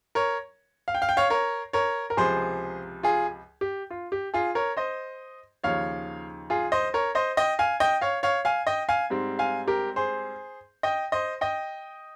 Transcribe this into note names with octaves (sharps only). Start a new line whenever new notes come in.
A#4 C#5
F5
G5
F5
G5
C#5 F5
A#4 C#5
A#4 C#5
A#4
C#2 C3 F3 G#4 C5
F4 G#4
G4
F4
G4
F4 G#4
A#4 C#5
C5 D#5
D#2 C#3 F3 C#5 F5
F4 G#4
C5 D#5
A#4 C#5
C5 D#5
D#5 G5
F5 G#5
D#5 G5
C#5 F5
C#5 F5
F5 G#5
D#5 G5
F5 G#5
G#2 G3 C4
F5 G#5
G4 A#4
G#4 C5
D#5 G5
C5 D#5
D#5 G5